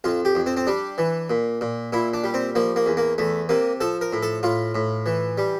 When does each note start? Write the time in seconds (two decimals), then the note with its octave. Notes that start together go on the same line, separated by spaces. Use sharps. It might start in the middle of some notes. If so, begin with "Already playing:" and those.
0.04 F2 F4
0.25 G4
0.35 F2
0.46 C4
0.57 C4
0.67 G3 D4
0.98 E3
1.30 A#2
1.61 A#2
1.93 A#2 E4
2.14 D4
2.24 G3
2.34 C4
2.55 F3 A#3
2.76 A#3
2.86 E2
2.97 A#3
3.18 E2 A3
3.49 C3 A#3
3.80 F3 A4
4.01 A#4
4.13 A2
4.23 A4
4.43 A2 F4
4.75 A2
5.06 E3
5.38 G3